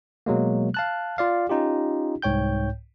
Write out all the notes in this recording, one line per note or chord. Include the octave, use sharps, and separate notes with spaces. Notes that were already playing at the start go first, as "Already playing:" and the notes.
B2 F#3 G#3 A#3
F5 A5 F#6
F4 D5 F5
C#4 D#4 F4 G4
C2 G#2 C#5 G5 G6